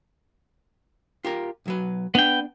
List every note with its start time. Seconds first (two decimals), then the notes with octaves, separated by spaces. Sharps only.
1.25 F4 G4 A#4
1.66 B1 F#3 B4
2.15 B3 D4 G5